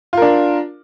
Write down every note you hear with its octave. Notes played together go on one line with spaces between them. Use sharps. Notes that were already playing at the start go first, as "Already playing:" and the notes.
D4 F4 A#4